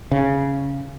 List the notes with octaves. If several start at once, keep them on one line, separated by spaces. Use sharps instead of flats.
C#3